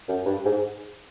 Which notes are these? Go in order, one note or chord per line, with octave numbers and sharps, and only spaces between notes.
F#2
G2
G#2